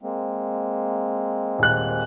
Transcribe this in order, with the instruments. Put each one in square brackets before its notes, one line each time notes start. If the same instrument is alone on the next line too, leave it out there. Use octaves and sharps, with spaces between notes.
[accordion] G#3 A#3 C4
[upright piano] D#1 F#6